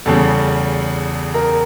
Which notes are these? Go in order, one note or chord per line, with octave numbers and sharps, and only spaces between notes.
E2 C#3 G3 A4
A#4